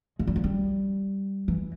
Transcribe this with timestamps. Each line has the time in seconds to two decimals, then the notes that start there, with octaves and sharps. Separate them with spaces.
0.19 G#3
0.27 G3
0.36 F3
0.44 G3
1.48 E3